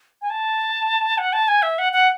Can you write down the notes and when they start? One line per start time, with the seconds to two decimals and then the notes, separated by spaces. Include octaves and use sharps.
0.22 G#5
0.30 A5
1.18 F#5
1.33 A5
1.48 G#5
1.62 E5
1.79 F#5
1.93 F#5